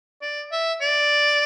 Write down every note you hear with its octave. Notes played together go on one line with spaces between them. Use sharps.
D5
E5
D5